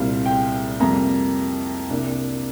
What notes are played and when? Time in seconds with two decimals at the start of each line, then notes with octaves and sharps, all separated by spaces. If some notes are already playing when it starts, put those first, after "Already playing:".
Already playing: C2 A#2 G3 C4 F5
0.26 G5
0.80 F2 C3 G3 A#3 A#5
1.90 C2 C3 A#3 D4